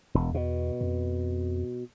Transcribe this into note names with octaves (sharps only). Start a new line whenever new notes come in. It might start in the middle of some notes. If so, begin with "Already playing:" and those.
E1 E2
B2
F2